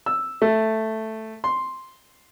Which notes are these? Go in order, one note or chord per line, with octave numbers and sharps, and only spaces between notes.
E6
A3
C6